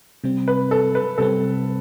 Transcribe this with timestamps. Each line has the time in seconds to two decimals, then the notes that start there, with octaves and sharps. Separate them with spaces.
0.24 C3 G3 C4
0.48 B4
0.71 A4
0.95 B4
1.18 C3 G3 C4 A4